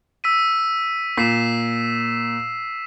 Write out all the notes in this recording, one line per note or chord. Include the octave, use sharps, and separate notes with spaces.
E6 B6 D#7
A#2 B6 C7 E7